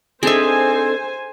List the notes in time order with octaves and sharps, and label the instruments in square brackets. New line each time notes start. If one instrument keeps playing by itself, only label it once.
[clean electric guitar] C4 D4 D#4 [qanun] G#4 E5 [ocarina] A4 [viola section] C5 G#5